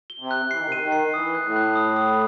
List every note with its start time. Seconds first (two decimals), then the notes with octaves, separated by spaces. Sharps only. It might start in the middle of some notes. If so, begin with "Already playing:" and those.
0.10 G7
0.20 C3
0.31 F#6
0.51 E3 C7
0.59 D#3
0.66 C3
0.72 D#3 D#7
0.82 D#3
0.92 C7
1.14 E3 D#6
1.35 F#6
1.45 A2
1.56 F#6
1.76 D#6
1.96 D#6